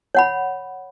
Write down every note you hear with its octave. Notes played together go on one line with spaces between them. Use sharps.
C#5 F#5 B5